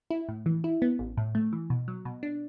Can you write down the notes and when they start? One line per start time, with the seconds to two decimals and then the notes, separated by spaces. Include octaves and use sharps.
0.10 E4
0.29 A2
0.46 E3
0.64 E4
0.82 B3
0.99 A1
1.17 A2
1.35 A3
1.53 E3
1.70 B2
1.88 F#3
2.05 B2
2.23 D4